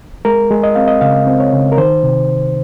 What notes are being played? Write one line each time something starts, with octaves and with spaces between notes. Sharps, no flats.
G#3 A#4
G#3
D#5
C4 F5
D#5
C#3 F5
C4
C#5
C#3
A#4
D#3 C5
C3